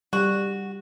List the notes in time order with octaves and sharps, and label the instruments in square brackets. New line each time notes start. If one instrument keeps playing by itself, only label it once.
[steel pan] G3 [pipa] F#4